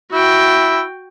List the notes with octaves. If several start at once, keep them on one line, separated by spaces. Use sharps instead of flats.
E4 F#4 G5